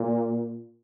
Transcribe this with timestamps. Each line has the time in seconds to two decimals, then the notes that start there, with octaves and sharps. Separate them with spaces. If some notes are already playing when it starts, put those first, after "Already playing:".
Already playing: A#2